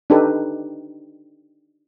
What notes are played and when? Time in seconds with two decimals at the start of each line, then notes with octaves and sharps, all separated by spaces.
0.10 D4 D#4 G4 A4 B4